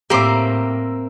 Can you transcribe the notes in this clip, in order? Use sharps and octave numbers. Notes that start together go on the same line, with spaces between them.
A2 A#3 C4 G4 E5 A#5 D6